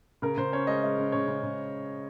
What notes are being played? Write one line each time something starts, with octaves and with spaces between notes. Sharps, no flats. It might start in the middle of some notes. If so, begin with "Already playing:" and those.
C#3 A#4
C#3 C5
C#4 C#5
G#3 D#5
G#3
C#3
C#3 C#5
C#3
C#3